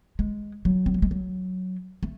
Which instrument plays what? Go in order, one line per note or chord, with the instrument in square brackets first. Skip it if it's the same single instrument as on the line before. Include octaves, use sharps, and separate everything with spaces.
[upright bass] G#3
F#3
C4
A3
G#3
F#3
A3